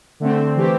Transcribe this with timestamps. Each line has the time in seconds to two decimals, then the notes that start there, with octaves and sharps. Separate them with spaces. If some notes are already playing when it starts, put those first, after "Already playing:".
0.20 D3 A3 C4
0.56 E3 A3 C4 G4